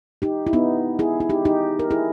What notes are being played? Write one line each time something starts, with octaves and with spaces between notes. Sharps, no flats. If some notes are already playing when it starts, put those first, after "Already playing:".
D#4 G4
E4
B3 D#4
E4 G#4
E4
D#4 G4
D#4 G4
A#4
E4 G#4